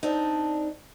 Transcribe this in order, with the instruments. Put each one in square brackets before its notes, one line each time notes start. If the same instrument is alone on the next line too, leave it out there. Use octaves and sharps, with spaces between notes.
[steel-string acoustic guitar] C4 D4 D#4